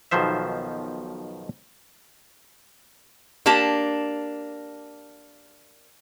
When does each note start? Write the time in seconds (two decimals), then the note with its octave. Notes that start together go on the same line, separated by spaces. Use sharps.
0.11 B1 B2 D#3 F3 C5 E5
3.46 A#3 D4 G4 A5